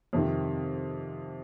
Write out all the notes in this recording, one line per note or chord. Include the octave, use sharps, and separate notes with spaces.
F2 C3 D#3